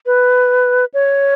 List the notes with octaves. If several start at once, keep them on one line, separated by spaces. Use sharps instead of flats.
B4
C#5